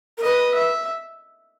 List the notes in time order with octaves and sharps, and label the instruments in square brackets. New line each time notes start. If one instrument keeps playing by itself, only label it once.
[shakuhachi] A#4
[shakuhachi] B4 [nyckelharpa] D#5
[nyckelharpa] E5